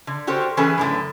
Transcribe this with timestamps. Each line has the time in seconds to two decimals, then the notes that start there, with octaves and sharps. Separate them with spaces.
0.07 D3
0.27 F#4 G4 A4 A#4 C5
0.57 E3 C#4 G#4 A4 B4
0.78 F#2 A2 D3